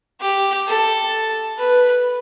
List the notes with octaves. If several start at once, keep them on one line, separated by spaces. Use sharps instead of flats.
G4
A4
B4